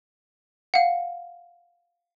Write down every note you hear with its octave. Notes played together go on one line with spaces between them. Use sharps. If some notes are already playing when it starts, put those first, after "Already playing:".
F5 F#5